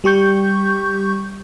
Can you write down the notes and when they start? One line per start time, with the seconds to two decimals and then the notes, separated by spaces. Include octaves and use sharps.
0.04 G3 G4 C#6 G6